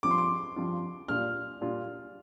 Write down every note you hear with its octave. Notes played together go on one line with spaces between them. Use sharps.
G2 F3 C4 F4 D6
C6
D6
G2 F3 C4 F4
A#2 G3 D4 F4 F6
A#2 G3 D4 F4